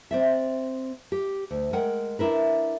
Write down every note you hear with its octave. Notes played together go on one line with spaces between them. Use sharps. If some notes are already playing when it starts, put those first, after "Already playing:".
C4 D5 E5
G4
D2
G#3 A#4 F#5 G5
D4 E4 A#4 B4